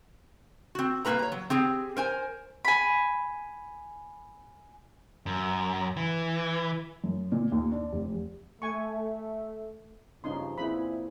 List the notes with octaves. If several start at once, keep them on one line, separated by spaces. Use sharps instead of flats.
C4 F#4
A#2 G3 A#3 F#4 B4 A#5
C#5 A#5
F#3
C4 G4 G#4
A#4 C5 G#5
G#5 B5
F#2
E3
F#2
A#2
D#2
D4
F1
A3 G#5 C#6
G2 C#3 F3 C#4 D#4 C6
A#2 C4 E4 G#4 B5